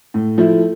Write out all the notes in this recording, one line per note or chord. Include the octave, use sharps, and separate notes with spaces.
A2
F3 A3 E4